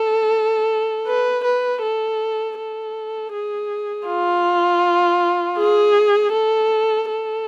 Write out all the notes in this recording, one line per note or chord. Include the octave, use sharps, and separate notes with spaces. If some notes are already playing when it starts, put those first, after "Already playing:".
Already playing: A4
B4
B4
A4
A4
G#4
F4
G#4
A4
A4